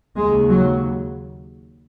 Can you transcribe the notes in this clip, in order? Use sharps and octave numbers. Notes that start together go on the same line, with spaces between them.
D#2 C#3 G#3
F#3